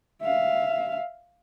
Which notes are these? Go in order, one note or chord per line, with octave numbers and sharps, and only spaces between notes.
E5 F5